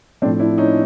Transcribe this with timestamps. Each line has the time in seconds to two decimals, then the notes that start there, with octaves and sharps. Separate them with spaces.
0.22 A2 F3 A3 C4 D4
0.40 D4 E4
0.58 C#4 D#4